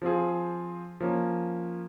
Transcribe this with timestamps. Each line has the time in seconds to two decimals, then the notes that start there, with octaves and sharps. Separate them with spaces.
0.02 F3 C4 F4 G#4
1.00 F3 A#3 C#4